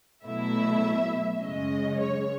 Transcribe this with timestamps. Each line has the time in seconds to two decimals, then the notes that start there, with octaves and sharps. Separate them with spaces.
0.24 B2 F#3 A3 E4 E5
1.41 F#2 C#3 G#3 C#4 D#5
2.00 C#5